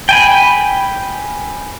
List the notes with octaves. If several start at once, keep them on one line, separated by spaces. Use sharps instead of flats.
G5 G#5 B5